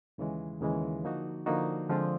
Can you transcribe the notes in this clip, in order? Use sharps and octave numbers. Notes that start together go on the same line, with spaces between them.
D#2 C#3 E3 G#3
D#2 C#3 E3 G#3
D3 F3 A#3 D#4 F#4
D3 F3 A#3 D#4 F#4
D3 F3 G#3 C4 F4